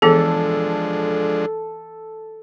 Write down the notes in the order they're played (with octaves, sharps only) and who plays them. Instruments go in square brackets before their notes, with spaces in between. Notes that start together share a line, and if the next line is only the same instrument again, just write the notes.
[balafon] E3 B3 G#4 [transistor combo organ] F3 G#3 D4 [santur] A4